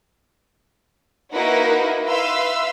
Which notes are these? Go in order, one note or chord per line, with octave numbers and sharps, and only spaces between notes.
A#3 D#4 E4 F#4 A#4 B4
B4 E5 F5 C6 E6